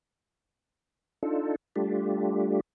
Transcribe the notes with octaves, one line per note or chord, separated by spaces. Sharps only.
D4 D#4 F4 A4
G3 A3 D4 F4 G4